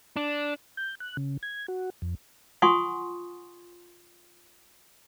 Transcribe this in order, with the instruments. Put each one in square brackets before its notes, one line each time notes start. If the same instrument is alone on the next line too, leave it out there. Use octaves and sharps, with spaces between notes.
[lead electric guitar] D4
[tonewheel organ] G6
F#6
C#3
G#6
F#4
F2
[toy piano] F4 F#5 G#5 C6 C#6 D#6